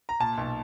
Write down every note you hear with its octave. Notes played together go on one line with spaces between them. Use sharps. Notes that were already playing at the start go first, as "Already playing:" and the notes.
A#5
A#2 A5
B1